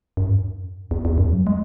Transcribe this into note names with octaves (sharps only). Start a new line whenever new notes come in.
F#2
G#2
F#2
E2
E2
F#2
F#3
G#3